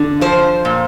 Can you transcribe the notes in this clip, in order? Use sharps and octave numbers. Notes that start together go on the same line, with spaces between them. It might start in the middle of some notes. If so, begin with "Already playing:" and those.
Already playing: D3
F3 C5
A#2